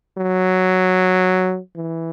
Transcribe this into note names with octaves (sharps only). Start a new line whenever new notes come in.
F#3
E3